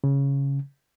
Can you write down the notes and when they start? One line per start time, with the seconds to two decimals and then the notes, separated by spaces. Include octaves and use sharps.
0.04 C#3